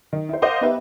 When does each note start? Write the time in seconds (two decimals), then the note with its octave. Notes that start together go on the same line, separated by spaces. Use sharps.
0.13 D#3
0.29 E4 C5
0.42 A#4 C5 D#5 F5 F#5 D6
0.61 B3 D#4 G4 B4 E5